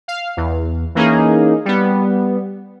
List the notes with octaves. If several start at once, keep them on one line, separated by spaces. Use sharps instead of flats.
F5
E2
E3 A#3 C#4 D#4 G#4
G3 B3